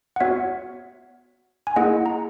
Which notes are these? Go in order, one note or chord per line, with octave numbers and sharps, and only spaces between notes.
F#5
B3 F#4 C#5 E5
G#5
A#3 E4 G#4 D#5 F#5
A#5